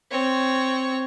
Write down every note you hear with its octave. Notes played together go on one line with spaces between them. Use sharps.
C4 C#5